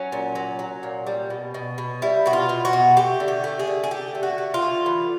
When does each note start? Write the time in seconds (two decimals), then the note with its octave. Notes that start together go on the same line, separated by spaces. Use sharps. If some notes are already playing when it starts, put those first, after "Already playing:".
Already playing: F#3 C#4
0.12 A#2
0.35 F#3
0.59 F#3
0.83 A#2
1.07 G3
1.30 B2
1.54 B2
1.78 B2
2.02 G3 E4
2.26 B2 F#4
2.33 F4
2.49 B2
2.65 F#4
2.73 B2
2.97 A3 G4
3.20 D3
3.28 G4
3.44 A3
3.59 G#4
3.67 D3
3.84 G#4
3.91 A3 G4
4.15 D3
4.23 F#4
4.38 A3
4.54 F4
4.62 D3
4.86 E3